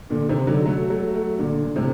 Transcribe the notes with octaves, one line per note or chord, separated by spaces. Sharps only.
A#2 D3
C3 D#3
D3 F#3
F#3 A3
F#3 A3
F#3 A3
A#2 D3
D3
A2 C3